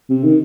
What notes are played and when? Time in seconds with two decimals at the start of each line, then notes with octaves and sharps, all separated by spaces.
0.09 C3
0.24 D#3